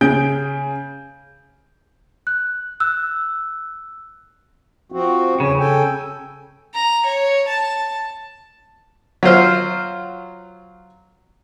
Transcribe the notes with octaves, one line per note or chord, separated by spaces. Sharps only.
C#3 G#4 G6 D7
F#6
E6 F#6
F3 C4 F#4
E2 G2 C#3 C#5
A4 G5 G#5
A#5
C#5
A5
F#3 F4 C5 F6